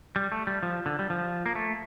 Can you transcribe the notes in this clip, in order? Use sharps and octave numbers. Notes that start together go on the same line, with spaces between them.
G3
A3
G3
F3
D3
G3
F3
A#3
A3